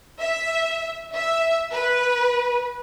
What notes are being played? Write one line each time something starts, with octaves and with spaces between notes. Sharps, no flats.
E5
E5
B4